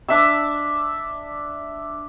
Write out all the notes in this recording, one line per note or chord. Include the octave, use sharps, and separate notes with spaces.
D4 E5 A5 E6